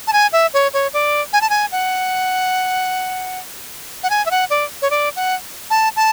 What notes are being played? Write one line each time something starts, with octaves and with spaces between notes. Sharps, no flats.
A5
G#5
E5
C#5
C#5
D5
G#5
A5
G#5
F#5
F#5
G#5
E5
F#5
D5
C#5
D5
F#5
A5
A5